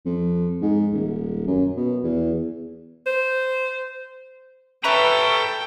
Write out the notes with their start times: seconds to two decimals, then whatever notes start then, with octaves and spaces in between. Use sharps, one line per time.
0.05 F2
0.61 G#2
0.93 D#1
1.47 F#2
1.77 B2
2.03 E2
3.07 C5
4.84 A4 B4 C#5 E5 G5 A#5